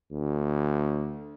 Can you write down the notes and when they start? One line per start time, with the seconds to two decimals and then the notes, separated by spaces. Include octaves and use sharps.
0.12 D2